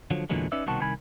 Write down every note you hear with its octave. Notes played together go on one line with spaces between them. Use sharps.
D3 F3 F#3
E2 A#2 D3 E3 F#3 G#3
C#4 D#4 B4 D5 E5
C2 B2 D#3 C4 F#4 A5
C2 D#3 G#5 B5